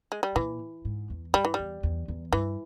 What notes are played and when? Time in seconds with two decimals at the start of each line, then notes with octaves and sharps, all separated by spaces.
0.12 G#3
0.23 G3
0.36 A#2 E3
0.85 G#2
1.10 E2
1.33 G2 G3
1.45 E3
1.54 E2 G3
1.83 E2
2.08 E2
2.32 G2 E3